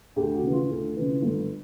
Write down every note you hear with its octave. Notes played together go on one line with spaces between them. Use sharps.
D2 G4
F#4
C#3 E3
F4
D2
C#3 E3
G1